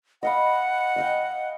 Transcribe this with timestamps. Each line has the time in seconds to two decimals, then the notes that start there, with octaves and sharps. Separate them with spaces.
0.23 D#5 F5 F#5 B5
0.96 D#5 F5 G5